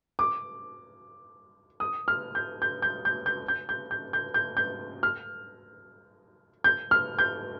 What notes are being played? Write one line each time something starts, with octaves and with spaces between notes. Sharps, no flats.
D6
D#6
F6
G6
G6
G6
G6
G6
G6
G6
G6
G6
G6
G6
F6
G6
F6
G6